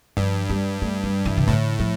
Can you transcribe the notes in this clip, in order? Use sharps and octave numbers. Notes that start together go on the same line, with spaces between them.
G2 F3
G3
A3
G3
E3
C3
A2 D3
F3